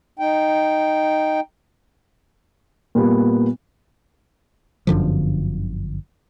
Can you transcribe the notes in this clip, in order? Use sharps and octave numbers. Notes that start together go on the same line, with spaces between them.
D#4 G5
A#2 G3 B3
G1 F#2 D3 F3